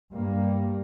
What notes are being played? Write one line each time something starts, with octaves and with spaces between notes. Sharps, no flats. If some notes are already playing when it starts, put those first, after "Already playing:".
G2 G3 A#3